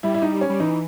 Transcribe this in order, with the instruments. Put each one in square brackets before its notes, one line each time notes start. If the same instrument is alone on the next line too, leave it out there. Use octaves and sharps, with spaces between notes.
[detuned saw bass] G3 [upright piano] E4
[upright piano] E4
D#4
C#4
[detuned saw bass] G3
[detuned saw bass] E3 [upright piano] D#4